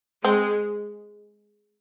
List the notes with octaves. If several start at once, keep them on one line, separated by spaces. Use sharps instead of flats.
G#3 C4